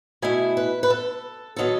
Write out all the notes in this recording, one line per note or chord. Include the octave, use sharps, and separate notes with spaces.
B2 A3 E4 G#5
B4
B4
A4
D#3 F#3 B3 A4